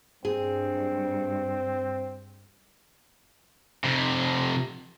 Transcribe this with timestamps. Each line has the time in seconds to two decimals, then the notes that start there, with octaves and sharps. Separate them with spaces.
0.25 G2 C4 G#4
3.84 F2 C3